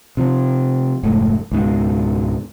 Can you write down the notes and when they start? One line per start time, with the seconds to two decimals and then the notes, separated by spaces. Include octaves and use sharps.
0.17 C3 F3
1.03 F1 G#2 A3
1.52 C#2 G#2 B2